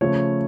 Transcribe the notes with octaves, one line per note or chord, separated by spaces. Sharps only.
C#3 F3 A3 C#5